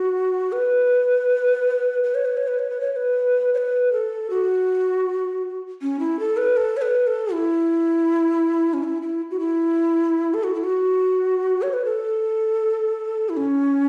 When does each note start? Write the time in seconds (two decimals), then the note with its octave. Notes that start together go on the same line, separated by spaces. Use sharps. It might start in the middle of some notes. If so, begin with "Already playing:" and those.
Already playing: F#4
0.52 B4
2.04 B4
2.15 C#5
2.25 B4
2.37 C#5
2.48 B4
2.59 C#5
2.70 B4
2.80 C#5
2.92 C#5
2.96 B4
3.54 C#5
3.58 B4
3.93 A4
4.30 F#4
5.82 C#4
6.00 E4
6.19 A4
6.37 B4
6.57 A4
6.77 C#5
6.82 B4
7.07 A4
7.33 E4
8.74 C#4
8.83 E4
9.02 E4
9.31 F#4
9.40 E4
10.34 A4
10.44 F#4
10.55 E4
10.64 F#4
11.62 C#5
11.73 B4
11.85 A4
13.29 E4
13.37 C#4